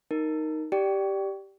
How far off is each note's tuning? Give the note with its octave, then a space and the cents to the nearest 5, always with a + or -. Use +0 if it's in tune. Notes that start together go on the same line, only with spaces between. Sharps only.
D#4 +0 A#4 +0
G4 -5 D5 +0 G5 -20